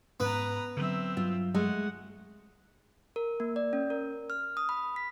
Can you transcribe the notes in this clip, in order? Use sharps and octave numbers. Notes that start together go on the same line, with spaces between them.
G#2 B3 C#4 B4 A#5
D3 F#3 C4 E5
G2 F#3 F4
G#3 A3 F#5
A#4
A#3
D5
C#4
A#4
F6
D#6
B5
B6